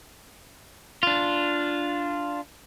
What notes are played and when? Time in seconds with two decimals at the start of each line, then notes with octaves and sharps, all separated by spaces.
1.03 D4 F4